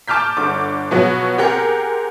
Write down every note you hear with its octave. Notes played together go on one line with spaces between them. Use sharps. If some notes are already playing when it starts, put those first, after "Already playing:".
A5 D6 F6 G6 B6
G1 D3 D6
B2 F3 F#3 B3 F#4
C4 G4 G#4 A#4 F#5